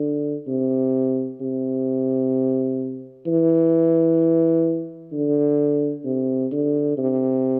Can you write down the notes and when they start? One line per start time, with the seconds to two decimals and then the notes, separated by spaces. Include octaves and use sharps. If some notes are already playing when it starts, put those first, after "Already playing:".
Already playing: D3
0.48 C3
1.41 C3
3.27 E3
5.13 D3
6.05 C3
6.52 D3
6.98 C3